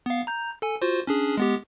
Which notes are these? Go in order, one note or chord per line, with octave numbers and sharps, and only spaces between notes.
B3 F5
A#5 G6
A4 G#5
F4 F#4 C5
C#4 D4 G#4
G#3 B3 G4